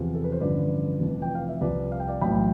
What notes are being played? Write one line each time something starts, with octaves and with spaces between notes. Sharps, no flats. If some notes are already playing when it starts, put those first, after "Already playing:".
Already playing: E2 C3 F3
A4
B4
C5
A1 G2 D3 F3 B4 D5
F1 F2 E3
G5
F5
E5
C2 C3 F3 B4 D5
F5
G5
D5 F5
B1 A2 E3 G5 B5